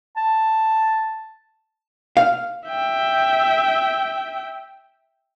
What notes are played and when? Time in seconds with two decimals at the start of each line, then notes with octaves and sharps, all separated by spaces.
0.17 A5
2.17 F5
2.69 E5 G5